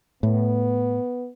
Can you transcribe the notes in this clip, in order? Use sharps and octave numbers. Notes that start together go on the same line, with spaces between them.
A2 B3